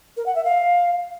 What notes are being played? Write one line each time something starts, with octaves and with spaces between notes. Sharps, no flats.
A#4
F#5
E5
F5